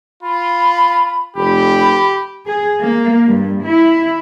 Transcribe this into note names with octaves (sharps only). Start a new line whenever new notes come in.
F4 B5
F1 G4 B5
G#4
A#3
G2
E4